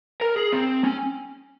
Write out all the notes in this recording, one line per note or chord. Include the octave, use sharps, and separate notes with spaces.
A#4
G#4
C4
C#4